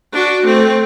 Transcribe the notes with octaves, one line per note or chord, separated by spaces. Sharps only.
D4 F#4
A3 C4